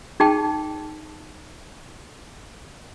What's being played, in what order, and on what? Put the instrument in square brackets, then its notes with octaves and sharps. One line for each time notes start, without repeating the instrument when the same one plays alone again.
[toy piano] D#4 G#4 G5 A5